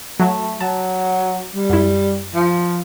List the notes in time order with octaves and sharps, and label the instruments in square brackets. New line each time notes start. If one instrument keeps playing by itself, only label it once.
[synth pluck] F#3 [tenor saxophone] A3
[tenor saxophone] F#3 [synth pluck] A5
[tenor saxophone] G3
[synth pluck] F#2 E4
[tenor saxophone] F3